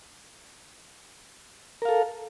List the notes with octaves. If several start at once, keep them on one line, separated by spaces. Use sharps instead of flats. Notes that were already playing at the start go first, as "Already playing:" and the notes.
A4 A#4 F5